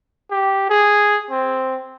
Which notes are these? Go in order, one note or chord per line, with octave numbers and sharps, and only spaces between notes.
G4
G#4
C4